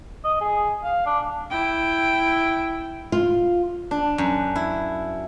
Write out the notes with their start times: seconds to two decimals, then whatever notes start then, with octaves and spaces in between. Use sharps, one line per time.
0.24 D#5
0.41 G#4
0.83 F5
1.06 D4
1.50 E4 G5
3.12 F4
3.91 D4
4.18 F#2
4.56 E4